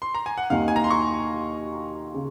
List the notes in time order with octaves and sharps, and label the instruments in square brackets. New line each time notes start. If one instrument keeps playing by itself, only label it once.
[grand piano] C6
A#5
G#5
F#5
[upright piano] D#2 D#3 A#3 D#4 [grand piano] F5
[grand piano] G#5
A#5
C6
C#6
[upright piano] C#3